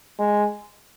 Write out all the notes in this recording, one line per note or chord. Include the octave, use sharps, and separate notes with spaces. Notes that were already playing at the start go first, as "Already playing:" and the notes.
G#3